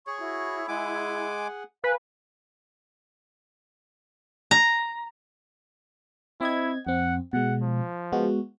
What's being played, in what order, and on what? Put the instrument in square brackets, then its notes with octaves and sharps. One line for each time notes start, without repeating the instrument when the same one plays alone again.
[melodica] G#4 C#5 [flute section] C#6
[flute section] E4 [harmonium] F#4
[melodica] G#3 G#5 D6 [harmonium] G#4 F#5
[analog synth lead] B4 [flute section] F5 G#5
[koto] A#5
[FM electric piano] C4 D#5 G#6 [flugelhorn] E4
[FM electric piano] F2 C4 [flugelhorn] F#5
[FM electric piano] B2 G#3 [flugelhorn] F#5
[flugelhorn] F3
[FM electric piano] G#3 B3 F#4